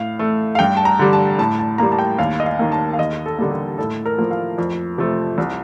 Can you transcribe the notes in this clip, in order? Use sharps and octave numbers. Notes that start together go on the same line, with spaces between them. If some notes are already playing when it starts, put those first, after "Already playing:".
Already playing: A2 F5
A3
F5
G2 G5
A5
A#5
D3 G3
A5
A2 A5
A5
G3 A#3 A#5
A5
G5
D#2 F5
D#5
F5
D#3 A#3
A5
F5
D#2 D#5
A4
D3 G3 A#3
G4
A2 A4
A#4
F3 A#3
F5
F2
C3 F3 A3
C2